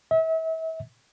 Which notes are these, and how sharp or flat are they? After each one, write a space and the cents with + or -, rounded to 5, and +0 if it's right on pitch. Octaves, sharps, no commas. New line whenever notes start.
E5 -35